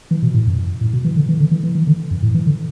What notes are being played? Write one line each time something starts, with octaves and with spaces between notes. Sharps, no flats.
E3
B2
A2
F#2
A2
B2
E3
D3
E3
D3
E3
E3
E3
D3
F#2
A2
E3
D3